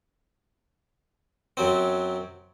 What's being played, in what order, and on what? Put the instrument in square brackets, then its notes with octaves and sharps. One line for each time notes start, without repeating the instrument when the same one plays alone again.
[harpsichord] F#2 F#3 C4